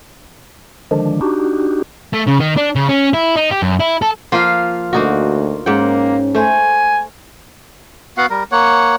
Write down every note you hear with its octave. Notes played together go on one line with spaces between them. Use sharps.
D3 D#3 F3 G#3 D4
D4 D#4 F#4 G4
A3
C#3
D#3
D4
C#3
C#4
E4
D#4
G4
F#2
E4
A4
F3 A#3 F4 F5
D2 A#3 D#4 F#4
G#2 A#3 C#4 F#5 G5
A3 C5 G#5
B3 F#4 F5 F#5
G3 A#4
A#3 C#5 F#5